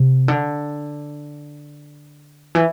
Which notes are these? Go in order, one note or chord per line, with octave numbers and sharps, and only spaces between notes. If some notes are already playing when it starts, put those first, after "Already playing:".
Already playing: C3
D3
E3